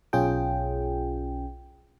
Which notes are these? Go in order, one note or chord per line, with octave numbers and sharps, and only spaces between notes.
B1 C#4 F4 G#4 G5